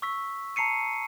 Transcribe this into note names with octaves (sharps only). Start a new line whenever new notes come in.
C#6 E6 B6
A5 A#5 C7 C#7 D#7